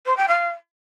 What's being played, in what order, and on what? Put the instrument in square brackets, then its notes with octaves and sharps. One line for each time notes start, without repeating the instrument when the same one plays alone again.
[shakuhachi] C5
G5
F5